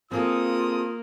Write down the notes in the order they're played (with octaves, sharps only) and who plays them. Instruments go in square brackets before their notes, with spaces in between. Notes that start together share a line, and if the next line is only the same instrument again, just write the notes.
[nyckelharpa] A#3 [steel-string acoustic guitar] C4 G#4 A4 [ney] F4 [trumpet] D#6